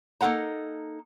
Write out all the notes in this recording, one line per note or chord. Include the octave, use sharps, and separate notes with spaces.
A#3 D#4 F4 A4 F#5 A#5